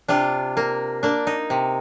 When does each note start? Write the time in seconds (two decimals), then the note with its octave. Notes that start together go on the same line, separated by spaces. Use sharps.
0.08 C3 D4 F4
0.57 A#3
1.03 A#3 D4
1.27 D#4
1.50 C3